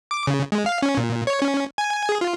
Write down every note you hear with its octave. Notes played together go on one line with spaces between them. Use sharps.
D6
C#3
G#3
F5
C#4
A#2
C#5
C#4
G#5
G#4
F4